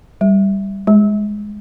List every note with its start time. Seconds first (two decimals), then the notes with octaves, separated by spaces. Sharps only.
0.21 G3
0.87 G#3